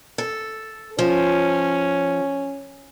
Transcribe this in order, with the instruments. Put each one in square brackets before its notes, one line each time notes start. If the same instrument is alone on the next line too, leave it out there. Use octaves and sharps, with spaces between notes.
[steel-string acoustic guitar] A4
[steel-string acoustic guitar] F3 [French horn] C#4